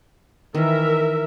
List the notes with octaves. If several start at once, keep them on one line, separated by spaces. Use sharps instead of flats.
D#3 E3 A#4 E5